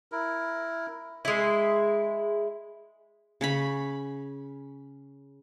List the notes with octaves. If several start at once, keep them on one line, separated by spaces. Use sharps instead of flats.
E4 A#4
G#3 E4
C#3 C#5 B5